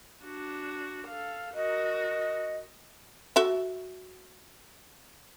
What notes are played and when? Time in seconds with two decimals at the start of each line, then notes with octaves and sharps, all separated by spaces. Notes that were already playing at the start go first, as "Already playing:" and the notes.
0.24 D4 F#4
1.08 A4 F5
1.54 F#4 A#4 D#5
3.36 F#4 A4 E5